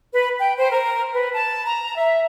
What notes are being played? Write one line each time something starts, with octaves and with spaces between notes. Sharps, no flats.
B4
G5
C5
A#4
B4
A5
A#5
E5